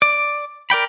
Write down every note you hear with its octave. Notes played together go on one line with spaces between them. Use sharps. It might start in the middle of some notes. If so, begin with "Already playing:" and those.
D5
A#4 D5 G5 B5